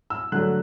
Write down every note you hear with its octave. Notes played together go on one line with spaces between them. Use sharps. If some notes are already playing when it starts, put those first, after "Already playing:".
E6
D3 F#3 A3 F#6